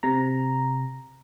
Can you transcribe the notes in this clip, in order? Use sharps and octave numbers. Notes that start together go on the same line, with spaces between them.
C3 A#5